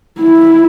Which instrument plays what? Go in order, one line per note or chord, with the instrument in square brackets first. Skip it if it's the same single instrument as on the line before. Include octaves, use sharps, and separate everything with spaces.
[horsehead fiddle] E4